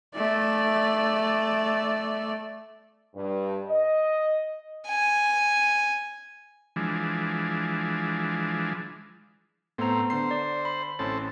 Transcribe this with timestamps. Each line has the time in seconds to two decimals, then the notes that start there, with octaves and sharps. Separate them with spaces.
0.15 A3 D5
3.15 G2
3.67 D#5
4.88 G#5
6.76 E3 F3 G#3 D4
9.78 A2 A3 B3 C4 C5 A#5
10.10 D3 C5 C7
10.31 D5
10.65 B5
10.99 A1 A2 C4 C#4 A4